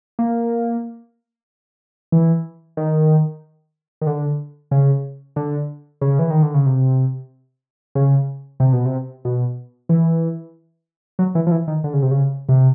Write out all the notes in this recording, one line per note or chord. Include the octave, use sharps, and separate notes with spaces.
A#3
E3
D#3
D#3
D3
C#3
D3
C#3
E3
D#3
D3
C#3
C3
C#3
C3
B2
C3
B2
E3
F#3
E3
F3
E3
D#3
D3
C#3
C3
C#3
C3